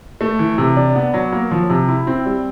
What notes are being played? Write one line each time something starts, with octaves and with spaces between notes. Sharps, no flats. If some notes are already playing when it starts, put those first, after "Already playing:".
A3
E3
C3
D4
B3
F#3
A#3
F3
C3
E4
C4
G3